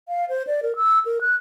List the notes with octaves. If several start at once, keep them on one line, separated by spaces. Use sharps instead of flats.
F5
C5
D5
A#4
E6
A#4
F#6